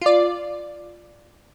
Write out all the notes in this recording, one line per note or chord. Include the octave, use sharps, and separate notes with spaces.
F4 D5